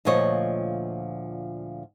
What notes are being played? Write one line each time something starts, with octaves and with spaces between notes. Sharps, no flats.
D2 A#2 F3 C#5 D#5